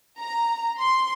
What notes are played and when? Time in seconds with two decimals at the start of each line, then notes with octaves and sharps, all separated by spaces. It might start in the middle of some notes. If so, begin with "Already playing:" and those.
0.19 A#5
0.78 C6